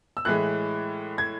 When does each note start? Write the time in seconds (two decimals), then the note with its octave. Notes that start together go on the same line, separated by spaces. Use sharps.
0.17 E6
0.25 A2 E3 G#3 F#6
1.18 G#6